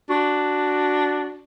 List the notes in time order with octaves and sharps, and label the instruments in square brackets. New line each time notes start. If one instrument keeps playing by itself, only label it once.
[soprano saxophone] D4 [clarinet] F#4